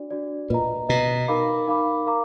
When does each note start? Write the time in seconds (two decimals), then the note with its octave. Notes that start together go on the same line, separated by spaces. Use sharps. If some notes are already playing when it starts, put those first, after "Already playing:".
Already playing: D4 F#4 D5
0.10 D4 F#4 D5
0.50 A#2 B4 D#5 A#5
0.89 B2 B4 D#5 A#5
1.28 D#4 A#4 F5 B5 D6
1.67 D#4 A#4 F5 B5 D6
2.06 A#4 F5 A#5 D6